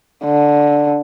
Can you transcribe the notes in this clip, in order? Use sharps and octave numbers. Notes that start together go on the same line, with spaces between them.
D3